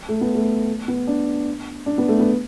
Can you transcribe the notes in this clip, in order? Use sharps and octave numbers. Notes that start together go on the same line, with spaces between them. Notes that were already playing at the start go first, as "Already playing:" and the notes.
A3
B3
A3
B3
D4
D4
B3
A3
B3